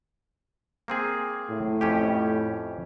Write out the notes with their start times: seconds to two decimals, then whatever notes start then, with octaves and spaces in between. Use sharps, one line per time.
0.88 A#3 C4 G#4
1.50 A2
1.81 F2 C#4 G4